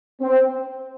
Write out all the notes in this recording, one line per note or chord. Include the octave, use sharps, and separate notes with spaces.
C4